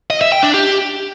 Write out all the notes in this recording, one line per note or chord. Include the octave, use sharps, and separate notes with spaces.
D#5
E5
G5
D4
G4